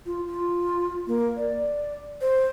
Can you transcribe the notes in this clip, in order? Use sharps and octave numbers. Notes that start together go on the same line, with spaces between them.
F4
F4
A#3
D5
C5